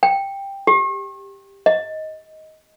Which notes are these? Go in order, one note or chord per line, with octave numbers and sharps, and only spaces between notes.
G5
G4
D#5